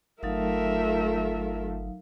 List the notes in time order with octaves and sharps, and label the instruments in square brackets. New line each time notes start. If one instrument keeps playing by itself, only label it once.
[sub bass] G1 [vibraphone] F#3 D#4 F5 [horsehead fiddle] A3 F4 [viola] A#4 E5